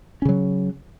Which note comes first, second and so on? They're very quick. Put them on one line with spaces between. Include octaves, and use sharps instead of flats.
C#4 C#3 F#3